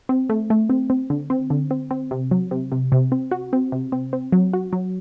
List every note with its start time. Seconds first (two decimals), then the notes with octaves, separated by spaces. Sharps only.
0.09 C4
0.30 A3
0.50 A3
0.70 C4
0.90 C4
1.10 D3
1.30 C4
1.50 D3
1.71 C4
1.91 C4
2.11 C3
2.31 F#3
2.51 C3
2.72 C3
2.92 C3
3.12 C4
3.31 F#4
3.53 C4
3.72 C3
3.92 C4
4.13 C4
4.32 F#3
4.53 F#4
4.73 F#3